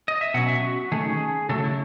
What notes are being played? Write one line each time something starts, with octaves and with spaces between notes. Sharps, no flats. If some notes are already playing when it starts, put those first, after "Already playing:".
D#5
E5
B2 F#3 C#4 F#5
E5
F#4
D#3 A3 C#4 G#4
C#3 F#3 A3 A4
E4